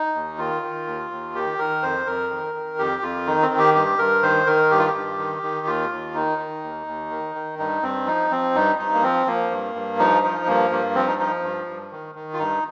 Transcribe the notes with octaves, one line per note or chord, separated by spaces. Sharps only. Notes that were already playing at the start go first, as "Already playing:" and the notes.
Already playing: D#4
D#2
D#3 F4
D#3
D#2
D#2
D#3 G4
D#3 A#4
F2 C5
F2 A#4
D#3
D#3
F2 G4
F2 F4
D#3 D#4
C4
D#3
G4
G2 G4
G2 A#4
D#3 C5
D#3 A#4
G2 G4
F4
G4
G2
D#3
D#3
D#2 F4
D#2
D#3 D#4
D#3
D#2
D#2
D#3
D#3
G2 D#4
G2 C4
F3 D#4
F3 C4
G2 D#4
G2 D#4
A#3
F3 C4
F3 A#3
G2
G2
F3 D#4
F3 D#4
G2 A#3
G2 A#3
F3 C4
D#4
F3 D#4
G2
G2
D#3
D#3
F4
G2 D#4